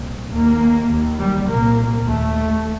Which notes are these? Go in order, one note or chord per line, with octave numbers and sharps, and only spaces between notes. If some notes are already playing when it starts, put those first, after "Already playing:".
Already playing: C2 A#2
D#2 A#3
D#2
G3
C2 A#2 A#3
D#2 A3